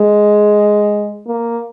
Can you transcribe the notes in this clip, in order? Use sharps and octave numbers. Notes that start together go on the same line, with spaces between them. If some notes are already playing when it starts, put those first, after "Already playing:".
Already playing: G#3
A#3